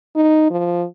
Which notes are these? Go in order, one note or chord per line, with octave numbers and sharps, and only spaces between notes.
D#4
F3